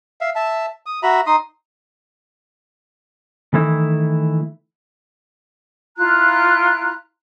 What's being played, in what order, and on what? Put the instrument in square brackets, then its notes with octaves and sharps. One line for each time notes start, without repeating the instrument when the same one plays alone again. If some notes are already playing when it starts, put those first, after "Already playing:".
[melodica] E5 F5
E5 A5
D#6
F#4 E5 A#5 B5
D#4 C6 D#6
[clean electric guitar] D#3 E3 A3 E4
[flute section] E4 F4 A#5 F#6